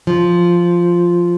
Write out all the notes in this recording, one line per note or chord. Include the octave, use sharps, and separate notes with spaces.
F3